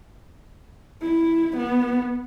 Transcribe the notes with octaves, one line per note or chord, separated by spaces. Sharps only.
E4
B3